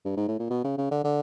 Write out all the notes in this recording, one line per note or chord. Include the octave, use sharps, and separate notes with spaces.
G2
G#2
A2
A#2
B2
C#3
C#3
D3
D3